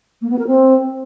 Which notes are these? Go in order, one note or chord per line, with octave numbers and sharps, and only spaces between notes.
A#3
B3
A#4
C4